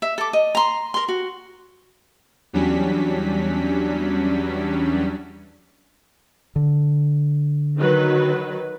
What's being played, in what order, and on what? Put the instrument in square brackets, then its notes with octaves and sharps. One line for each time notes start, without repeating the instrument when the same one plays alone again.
[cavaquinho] E5
A4 D6
D#5
A#5 C6
A#4 C6
F#4
[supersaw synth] E2 F#3 G3 C#4 D4 B6
[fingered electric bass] D3
[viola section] D#3 F#3 B4